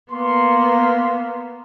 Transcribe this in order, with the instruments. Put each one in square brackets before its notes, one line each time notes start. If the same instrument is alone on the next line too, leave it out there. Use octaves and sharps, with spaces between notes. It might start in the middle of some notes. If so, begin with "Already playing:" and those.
[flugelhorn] A#3 [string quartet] B3 [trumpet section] C6